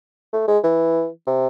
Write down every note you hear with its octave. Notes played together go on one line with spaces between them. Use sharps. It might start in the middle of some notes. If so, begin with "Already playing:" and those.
A3
G#3
E3
C3